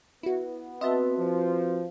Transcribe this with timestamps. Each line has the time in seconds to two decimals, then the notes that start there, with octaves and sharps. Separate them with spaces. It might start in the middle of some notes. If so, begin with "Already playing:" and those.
0.23 B3 E4 F#4
0.81 C4 F#4 B4 D#5 E5 A5
1.17 F3